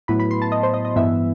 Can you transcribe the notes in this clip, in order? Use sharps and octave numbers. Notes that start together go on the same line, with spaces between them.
A2 F#3 B3 E4 B5
B5
C6
A5
D#5
C5
D#5
D#5
G2 E3 B3 E4 E5